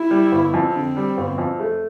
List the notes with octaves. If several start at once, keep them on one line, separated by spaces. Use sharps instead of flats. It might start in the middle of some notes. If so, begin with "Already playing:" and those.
Already playing: E4
G3
G1
F2
D3 C4
G3
G1
F2
A3